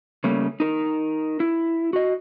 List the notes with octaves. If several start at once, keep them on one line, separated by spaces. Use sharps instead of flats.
C#3 G3 A3 A#3 C#4
D#4 A#4
E4
F#4 D#5